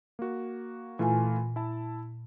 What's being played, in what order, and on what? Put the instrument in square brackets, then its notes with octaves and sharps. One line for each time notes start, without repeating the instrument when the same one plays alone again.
[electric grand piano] A#3 F#4
[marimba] A#2 G#5 [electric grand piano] E3 A3 F4
[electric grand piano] E4 A5